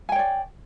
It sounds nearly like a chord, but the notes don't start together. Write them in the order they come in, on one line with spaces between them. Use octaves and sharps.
G#5 G5 C#5 D5